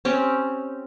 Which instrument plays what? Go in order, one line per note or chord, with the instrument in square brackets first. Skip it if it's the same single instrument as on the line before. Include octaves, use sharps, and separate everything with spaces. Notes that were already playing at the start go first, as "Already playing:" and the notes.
[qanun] C4 C#4 G4